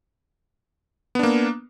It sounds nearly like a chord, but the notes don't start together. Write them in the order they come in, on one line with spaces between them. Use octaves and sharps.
B3 D4 A#3